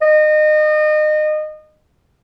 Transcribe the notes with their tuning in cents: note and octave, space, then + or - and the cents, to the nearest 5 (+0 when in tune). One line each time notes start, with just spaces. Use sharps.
D#5 -30